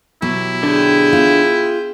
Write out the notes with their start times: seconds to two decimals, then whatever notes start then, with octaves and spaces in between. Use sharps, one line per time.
0.22 B2 F#3 E4 G4
0.63 D3 G#4 G5
1.13 F4